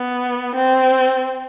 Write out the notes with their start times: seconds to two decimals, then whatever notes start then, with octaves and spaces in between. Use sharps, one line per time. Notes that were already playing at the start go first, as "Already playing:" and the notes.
Already playing: B3
0.55 C4